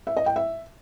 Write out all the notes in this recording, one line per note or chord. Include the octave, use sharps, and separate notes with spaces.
E5
D#5
G5
E5